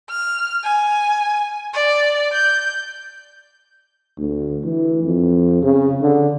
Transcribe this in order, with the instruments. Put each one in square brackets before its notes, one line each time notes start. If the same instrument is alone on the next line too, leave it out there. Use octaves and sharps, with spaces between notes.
[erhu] F6
G#5
D5
G6
[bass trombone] D2
E3
F2
C#3
D3